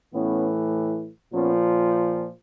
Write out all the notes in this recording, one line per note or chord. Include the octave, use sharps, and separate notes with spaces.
A2 E3 B3 C#4
A#2 F3 B3 C#4